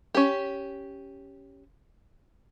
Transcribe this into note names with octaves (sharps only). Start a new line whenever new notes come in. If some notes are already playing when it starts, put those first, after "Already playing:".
C#4 G4